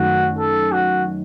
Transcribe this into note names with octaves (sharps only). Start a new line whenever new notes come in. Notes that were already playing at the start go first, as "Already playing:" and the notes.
Already playing: F#2 D#3 A3 F#4
A4
F#4